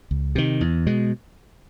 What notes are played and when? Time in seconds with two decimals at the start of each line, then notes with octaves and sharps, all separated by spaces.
0.11 C#2
0.35 C3 D#3
0.61 E2
0.87 B2 G#3